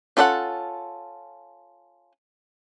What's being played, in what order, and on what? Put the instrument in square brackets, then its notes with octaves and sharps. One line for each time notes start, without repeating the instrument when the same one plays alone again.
[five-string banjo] C#4 F4 A4 B4 F#5